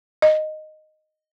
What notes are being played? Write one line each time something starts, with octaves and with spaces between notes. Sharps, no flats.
D#5